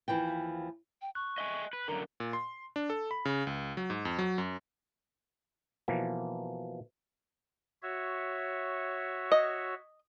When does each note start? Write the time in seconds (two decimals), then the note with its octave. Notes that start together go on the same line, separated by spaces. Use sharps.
0.08 D#2 E3 F3 G5
1.02 G5
1.15 C#6 F#6
1.38 D#5 E5 G#5
1.73 B4
1.88 F#2 D3 A#4 A#5
2.20 A#2
2.33 C6
2.76 D4
2.90 A4
3.11 B5
3.25 C#3
3.47 C#2
3.77 F#3
3.90 G#2
4.05 F2
4.19 F#3
4.38 F#2
5.88 B2 E3 F3 A#3
7.82 F#4 C#5 E5
9.32 D#5